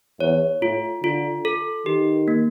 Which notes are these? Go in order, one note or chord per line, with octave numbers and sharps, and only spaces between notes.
E2 C#5
A2 F4
D3 F4
A4
D#3 G4
A#3